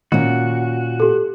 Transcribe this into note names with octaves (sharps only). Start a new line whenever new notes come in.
A#2 D#3 C#4 F#4
G4 A4